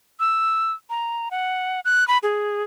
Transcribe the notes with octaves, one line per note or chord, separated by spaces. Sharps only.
E6
A#5
F#5
F#6
B5
G#4